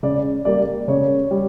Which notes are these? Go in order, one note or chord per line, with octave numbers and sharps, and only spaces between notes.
C#3 D5
G3 A#3 D5
C#3 C#5
G3